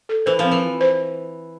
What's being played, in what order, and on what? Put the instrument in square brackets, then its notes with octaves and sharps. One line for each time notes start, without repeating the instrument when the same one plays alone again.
[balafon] A4
[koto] E3 [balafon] C5
[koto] F3
[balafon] C4
[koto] E3
[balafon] F4
C5